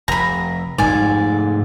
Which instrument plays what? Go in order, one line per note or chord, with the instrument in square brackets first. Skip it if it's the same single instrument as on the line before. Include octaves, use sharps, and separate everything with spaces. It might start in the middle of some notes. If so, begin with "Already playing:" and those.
[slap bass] F1 [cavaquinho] A#5 B5
[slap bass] F1 E2 G#3 [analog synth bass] G#2 [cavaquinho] D5 G#5